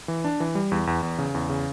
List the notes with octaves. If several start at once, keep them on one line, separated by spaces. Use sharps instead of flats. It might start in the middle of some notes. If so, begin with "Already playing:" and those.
E3
D4
E3
G3
E2
E2
E2
C#3
E2
C#3